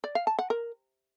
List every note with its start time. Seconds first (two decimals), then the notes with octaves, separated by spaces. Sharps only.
0.04 D5
0.15 F5
0.27 A5
0.39 F#5
0.50 A#4